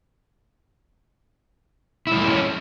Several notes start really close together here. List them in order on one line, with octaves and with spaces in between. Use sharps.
E4 G#3 F3 A3 C#4